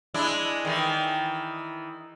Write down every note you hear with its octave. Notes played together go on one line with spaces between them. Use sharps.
G#3 D4 E4
D#3 E3